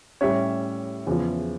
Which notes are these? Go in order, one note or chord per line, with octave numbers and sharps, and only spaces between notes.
A2 G3 C#4 C#5 E5
E2 C#3 F3